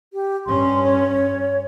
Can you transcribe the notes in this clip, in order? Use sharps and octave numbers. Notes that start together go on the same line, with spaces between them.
G4
G2 C#4 C6
C#5